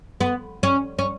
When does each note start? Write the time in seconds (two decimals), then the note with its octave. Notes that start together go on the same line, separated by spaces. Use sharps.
0.20 B3
0.63 C#4
0.99 C#4